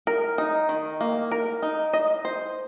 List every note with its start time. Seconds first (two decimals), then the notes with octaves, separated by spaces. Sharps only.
0.07 A#4
0.38 D#4
0.69 D#3
1.01 A#3
1.32 A#4
1.62 D#4
1.93 D#5
2.25 C5